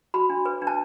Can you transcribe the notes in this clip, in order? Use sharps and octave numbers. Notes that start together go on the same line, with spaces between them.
F#4 B5
D4
B4
D4
A5